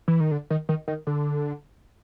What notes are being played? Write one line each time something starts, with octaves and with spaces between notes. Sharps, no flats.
E3
D#3
D3
D#3
D#3
D#3
D3